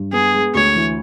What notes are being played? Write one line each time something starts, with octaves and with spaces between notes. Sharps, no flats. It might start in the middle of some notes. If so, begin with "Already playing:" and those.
Already playing: G2
B3 G#4
G#3
D2 C#5
E3